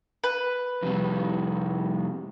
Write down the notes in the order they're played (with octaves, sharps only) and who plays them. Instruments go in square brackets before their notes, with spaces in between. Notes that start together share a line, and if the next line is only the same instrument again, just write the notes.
[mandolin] B4
[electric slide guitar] F2 C3 G3